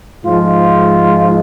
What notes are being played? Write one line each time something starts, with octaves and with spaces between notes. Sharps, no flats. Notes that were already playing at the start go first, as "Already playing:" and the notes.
G#2 F3 G#3 F4